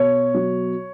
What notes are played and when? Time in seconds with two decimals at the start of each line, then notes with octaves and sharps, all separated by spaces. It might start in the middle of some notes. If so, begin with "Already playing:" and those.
Already playing: B2 C#5
0.34 F#3